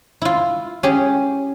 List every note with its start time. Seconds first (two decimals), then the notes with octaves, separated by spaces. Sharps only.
0.22 E4 F4
0.83 C#4 G4 G#4